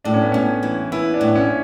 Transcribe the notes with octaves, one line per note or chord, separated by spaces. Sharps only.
A2 D4
C#4
B3
A2 C#4
E3
B3 E4
D4
A2
C#4